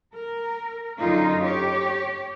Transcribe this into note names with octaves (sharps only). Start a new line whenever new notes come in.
A#4
F#2 D3 D#4 F4
G4 C#5